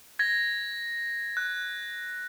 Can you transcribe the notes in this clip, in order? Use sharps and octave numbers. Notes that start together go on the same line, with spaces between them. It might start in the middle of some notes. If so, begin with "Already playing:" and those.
G#6 A#6
F#6